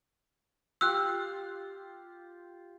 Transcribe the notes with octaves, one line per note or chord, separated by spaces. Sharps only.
F4 G4 E6 F#6